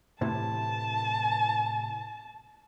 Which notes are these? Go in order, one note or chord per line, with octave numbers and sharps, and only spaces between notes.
A2 C3 E3 A5